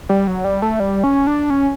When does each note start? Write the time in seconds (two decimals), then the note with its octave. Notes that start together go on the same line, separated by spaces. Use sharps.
0.09 G3
0.27 F#3
0.44 G3
0.62 A3
0.80 G3
1.04 C#4
1.27 D4
1.50 C#4